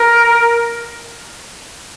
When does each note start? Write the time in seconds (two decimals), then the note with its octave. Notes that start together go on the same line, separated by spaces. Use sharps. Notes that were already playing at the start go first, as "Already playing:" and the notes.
Already playing: A#4